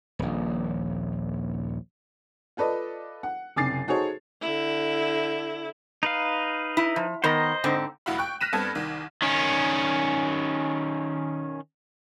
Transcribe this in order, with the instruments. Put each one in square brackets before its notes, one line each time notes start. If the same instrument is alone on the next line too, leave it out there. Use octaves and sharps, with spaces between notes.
[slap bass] D#1 A#1
[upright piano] F4 A4 B4 D5 D#5
F#5
F#1 C3 G#5 D6 A6 C7
D#4 F#4 G#4 A4 C5 C#5
[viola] D3 E4
[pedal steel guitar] D#4 B4 F5
[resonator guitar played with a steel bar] E4
F3
[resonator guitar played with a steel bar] D#3 B3 A#4 [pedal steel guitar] C5 D#5
[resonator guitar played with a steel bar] G#2 D3 C4
[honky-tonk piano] F1 A#1 E4 F#4 F5 B5
G5 C#6 F#6
F6 F#6 A#6 B6 D#7 E7
G2 B3 C4 A4 A5 G#6
C2 D#3
[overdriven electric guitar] D#3 C#4